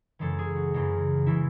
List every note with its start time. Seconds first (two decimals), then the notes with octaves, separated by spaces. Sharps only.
0.19 F#2 C#3 E3 G#3 A4
0.39 G#4
0.56 F#4
0.74 F#2 C#3 E3 G#3
1.26 C#3 E3 G#3 E4